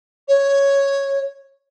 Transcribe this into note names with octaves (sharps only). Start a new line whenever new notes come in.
C#5